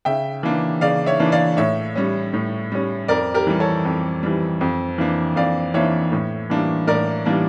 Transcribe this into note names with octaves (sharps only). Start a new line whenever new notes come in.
C#3 E5 G5
E3 A#3 D4
C#3 D5 F5
C#5 E5
E3 A#3 D4
D5 F5
A2 C#5 E5
G3 C#4
A2
G3 C#4
F2 A#4 D5
G4 A#4
E3 G3
A4 C#5
F2
E3 G3
F2
E3 A#3 D4
F2 D5 F5
E3 A#3 D4 C#5 E5
A2
E3 G3 A#3 D4
A2 A#4 D5
E3 G3 A#3 D4